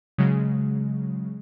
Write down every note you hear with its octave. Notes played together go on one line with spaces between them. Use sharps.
C#3 F#3 G#3